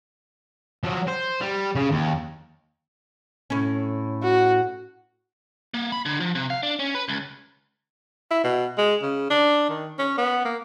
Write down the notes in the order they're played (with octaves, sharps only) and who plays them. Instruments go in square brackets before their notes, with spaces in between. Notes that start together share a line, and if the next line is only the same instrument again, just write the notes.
[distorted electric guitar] F3 F#3
C5
G3
C#3
D#2
[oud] A2 C#4
[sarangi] F#4
[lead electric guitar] A#3
B5
D3
F3
C3
F5
D4
C#4
B4
C#2
[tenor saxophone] E4
B2
G#3
C#3
D4
D#3
C#4
B3
A#3